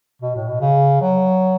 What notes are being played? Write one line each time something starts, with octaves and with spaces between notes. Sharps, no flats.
B2
A2
B2
C#3
F#3